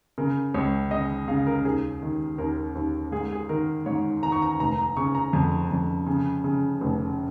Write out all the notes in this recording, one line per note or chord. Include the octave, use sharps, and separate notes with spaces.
C#3 A#4
C#2 C#5
C#3 D#5
C#3 F5
A#4
D#2 G#4
D#3
D#2 A#4
D#2
G#2 G#4
G#4
D#3 A#4
G#2 C#5
D#3 A#5
C#6
A#5
F1 A#5
A#5
C#3 C#6
A#5
F2
F2
C#3
C#3
F1